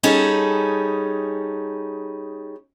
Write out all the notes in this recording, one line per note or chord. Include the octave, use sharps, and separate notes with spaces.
G3 C#4 D#4 G#4 A4